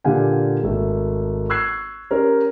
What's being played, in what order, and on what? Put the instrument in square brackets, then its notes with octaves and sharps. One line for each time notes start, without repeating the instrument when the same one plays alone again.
[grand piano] A#2 D3 G4 F5 F#5 G#5
G#1 A3
C#6 E6 F#6 G#6 C7
C#4 G4 A#4 C5